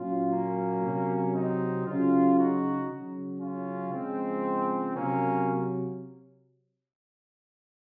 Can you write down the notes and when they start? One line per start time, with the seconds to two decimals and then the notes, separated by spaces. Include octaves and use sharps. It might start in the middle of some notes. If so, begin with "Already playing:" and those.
Already playing: A#2 F#3 C#4 F4
0.31 A#3 C#4
0.82 C3 F#3
1.34 C4 D#4
1.86 C#3 F#3 C#4 F4
2.37 D#4 F#4
2.90 C#3 F#3
3.40 C#4 F4
3.92 C#3 F3 G#3 C4
4.96 C3 F#3 A#3 C#4